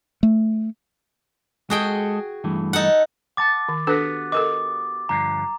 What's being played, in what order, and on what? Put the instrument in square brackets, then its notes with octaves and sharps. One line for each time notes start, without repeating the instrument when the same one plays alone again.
[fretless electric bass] A3
[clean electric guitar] G#3 A4 D#5 [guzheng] F#4 G#4 G5
[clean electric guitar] G2 E3 A3
[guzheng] D#4 A4 F#5
[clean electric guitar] F#5 A5 [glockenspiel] D6 A6
[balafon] D#3
[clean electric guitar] B3 F#4 G4 [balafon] D4 A4 B4
[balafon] A4 A#4 D#5 [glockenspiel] D6
[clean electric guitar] G2 D3 F3 [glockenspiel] A#5